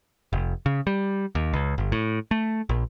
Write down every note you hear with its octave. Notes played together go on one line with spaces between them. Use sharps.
F1
C#3
G3
D#2
C#2
G1
A2
A3
A#1